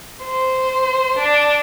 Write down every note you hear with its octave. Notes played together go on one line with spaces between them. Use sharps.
C5
D4